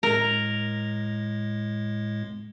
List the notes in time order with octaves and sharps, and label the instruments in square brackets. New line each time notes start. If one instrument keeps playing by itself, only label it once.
[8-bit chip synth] A2 G#3 [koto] A#4